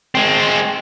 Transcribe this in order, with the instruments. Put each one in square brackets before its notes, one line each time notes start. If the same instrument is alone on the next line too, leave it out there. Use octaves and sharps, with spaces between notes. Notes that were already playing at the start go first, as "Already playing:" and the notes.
[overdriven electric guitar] G#3 C4